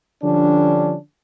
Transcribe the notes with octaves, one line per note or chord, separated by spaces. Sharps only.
D3 F3 G3 C#4 D4